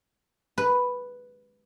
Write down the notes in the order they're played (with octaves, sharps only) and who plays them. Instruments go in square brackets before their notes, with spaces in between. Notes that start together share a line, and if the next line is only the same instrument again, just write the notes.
[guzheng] B4